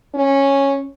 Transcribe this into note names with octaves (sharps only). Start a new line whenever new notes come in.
C#4